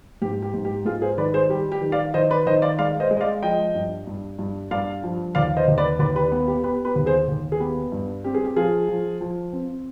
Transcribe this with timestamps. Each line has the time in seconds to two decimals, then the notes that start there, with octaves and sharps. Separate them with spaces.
0.22 G#2 G4
0.42 G4
0.54 G#2
0.65 G4
0.85 G#2 F4 G#4
1.02 G#4 C5
1.18 D#3 B4 D5
1.34 G#4 C5
1.49 G3 G4
1.72 G4
1.82 D#3
1.92 D5 F5
2.14 D#3 C5 D#5
2.30 B4 D5
2.46 D#3 C5 D#5
2.62 D5 F5
2.78 G#3 D5 F5
3.00 C5 D#5
3.11 G#3
3.17 D#5
3.21 D5 F5
3.43 F3 D#5 G5
3.75 G2
4.07 G2
4.39 G2
4.71 G2 D5 F5
5.03 F3
5.35 D#2 D5 F5
5.57 C5 D#5
5.68 D#2
5.78 B4 D5
5.99 D#2 B4 D5
6.15 G4 B4
6.32 B3
6.47 G4
6.63 B3 G4 B4
6.85 G4 B4
6.96 D#2
7.06 G#4 C5
7.28 D#2
7.52 G#4
7.60 B3 G4
7.92 G2
8.24 C4 G4
8.34 G#4
8.44 G4
8.56 F3 F4 G#4
8.89 F3
9.21 F3
9.53 C4